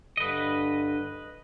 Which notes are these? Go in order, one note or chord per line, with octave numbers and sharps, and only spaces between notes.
G2 D3 B4 D#5